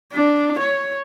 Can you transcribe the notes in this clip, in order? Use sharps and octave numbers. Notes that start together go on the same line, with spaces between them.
D4
C#5